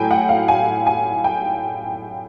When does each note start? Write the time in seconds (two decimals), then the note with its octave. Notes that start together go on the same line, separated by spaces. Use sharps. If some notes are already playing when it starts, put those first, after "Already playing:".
Already playing: A2 F#3 G5 G#5
0.11 F#5
0.29 F5
0.48 G#5
0.87 G#5
1.24 G5